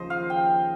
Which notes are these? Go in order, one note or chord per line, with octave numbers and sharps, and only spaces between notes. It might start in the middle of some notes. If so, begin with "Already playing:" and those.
Already playing: D#2 C#3 F3 C5 D#5
F5
G5